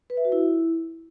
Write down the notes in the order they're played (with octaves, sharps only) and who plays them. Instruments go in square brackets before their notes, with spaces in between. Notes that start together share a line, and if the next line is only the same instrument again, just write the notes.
[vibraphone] B4
E5
F#4
E4